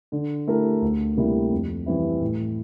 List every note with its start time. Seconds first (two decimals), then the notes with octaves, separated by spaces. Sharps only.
0.12 D3
0.47 A3 E4 G4 A#4
0.82 D2
1.17 C3 G3 A#3 E4
1.52 F2
1.86 E3 G3 C4 E4
2.21 A2